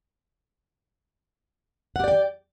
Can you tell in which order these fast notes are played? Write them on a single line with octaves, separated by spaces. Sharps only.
F#5 G4 D5 G5